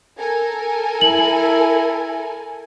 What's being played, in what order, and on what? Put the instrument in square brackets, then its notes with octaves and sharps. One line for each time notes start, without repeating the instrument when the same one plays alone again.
[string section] A4 A#4 G#5
[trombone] E4 [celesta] F#7